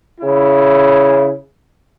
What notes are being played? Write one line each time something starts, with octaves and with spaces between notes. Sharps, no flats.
C#3 E4